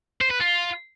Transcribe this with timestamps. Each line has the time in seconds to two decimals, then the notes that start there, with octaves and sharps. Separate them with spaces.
0.21 C5
0.30 B4
0.40 F4